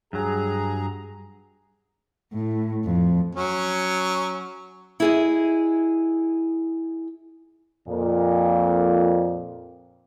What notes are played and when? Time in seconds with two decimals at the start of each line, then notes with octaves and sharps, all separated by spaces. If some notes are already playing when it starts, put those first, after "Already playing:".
0.13 G2 F#3 G#4 A#5
2.33 A2
2.85 F2
3.35 F#3 C#4
5.00 E4 G#4 D#5
7.87 F2 A#2